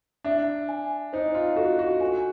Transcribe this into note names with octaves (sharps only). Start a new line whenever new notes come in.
D4 E5
G#5
D#4 C5
F4
F#4 A4
F#4
F#4 G#5